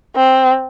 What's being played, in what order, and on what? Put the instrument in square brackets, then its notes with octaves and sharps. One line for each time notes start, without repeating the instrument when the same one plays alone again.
[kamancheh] C4